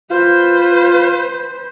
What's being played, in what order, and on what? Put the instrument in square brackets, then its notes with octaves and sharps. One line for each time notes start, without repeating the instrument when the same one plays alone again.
[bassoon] F4 [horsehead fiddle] B4 C5